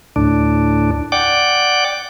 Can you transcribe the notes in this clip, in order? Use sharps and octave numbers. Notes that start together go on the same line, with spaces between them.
D2 A2 D4
D5 F#5 G5 D6